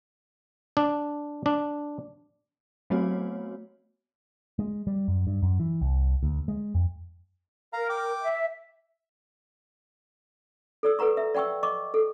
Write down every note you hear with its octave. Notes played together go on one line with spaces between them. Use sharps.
D4
D4
F#3 A3 B3 C4 F#4 C#5
G#3
G3
F#2
G2
F#2
E3
C2
D2
G#3
F2
A#4 F5 A#5
G5 D6
E5
A4 D5 E6
A4 B4 F#5 A#5 C#6
E5
D5 F#5 G5 C#6 E6
D#5 C#6 D6
A4